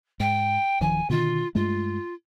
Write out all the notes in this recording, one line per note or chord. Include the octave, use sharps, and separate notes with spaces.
G#2 G5
D1 D#3 F3 G#5
B2 D3 D#3 F4
G2 G#3 A3 F4